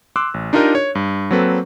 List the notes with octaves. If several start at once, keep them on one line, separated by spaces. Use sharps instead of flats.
C6 D6 E6 F#6
A1
D4 D#4 F4 G4 A#4 D#5
C#5
G2
F#3 A#3 C4 A4 B4